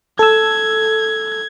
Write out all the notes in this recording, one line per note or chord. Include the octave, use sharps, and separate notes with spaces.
A4 E6 G#6